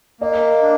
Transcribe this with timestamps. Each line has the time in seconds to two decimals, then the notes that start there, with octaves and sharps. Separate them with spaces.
0.21 A#3 D#5
0.62 D4